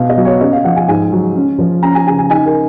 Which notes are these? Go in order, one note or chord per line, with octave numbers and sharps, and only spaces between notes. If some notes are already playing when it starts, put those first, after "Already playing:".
Already playing: B2 F5
D#5
F#3
C#5
C#4 D#5
F5
F3 F#5
G#5
G#2 G#5
F#3
C#4
F3
C#4 A#5
G#5
C#3 G#5
G#5
D#4 G#5
A#4